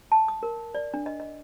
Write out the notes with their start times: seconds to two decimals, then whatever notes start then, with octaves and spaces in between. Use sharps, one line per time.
0.12 A5
0.28 D#6
0.43 A#4
0.75 D5
0.94 D4
1.06 D#5
1.20 D#5